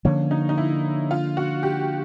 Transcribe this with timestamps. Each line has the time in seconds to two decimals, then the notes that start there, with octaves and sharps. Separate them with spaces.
0.05 D3 F3 A#3 C#4
0.31 D#4
0.49 D#4
0.58 E4
1.11 F4
1.37 F#4
1.63 G4